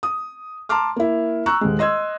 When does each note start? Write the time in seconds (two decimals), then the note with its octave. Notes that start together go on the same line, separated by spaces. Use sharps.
0.03 D#6
0.69 A5 A#5 C6 D6 F6
0.96 A#3 E4
1.46 A#5 C#6 E6 F#6
1.61 D#1 G#3
1.79 D#5 C6 E6 G#6